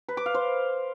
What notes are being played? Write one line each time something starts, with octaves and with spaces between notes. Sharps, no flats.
B4
D6
F5
C5